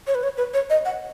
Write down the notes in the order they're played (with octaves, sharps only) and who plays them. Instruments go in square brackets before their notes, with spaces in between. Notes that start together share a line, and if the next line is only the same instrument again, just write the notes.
[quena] C#5
B4
C#5
B4
C#5
D#5
F#5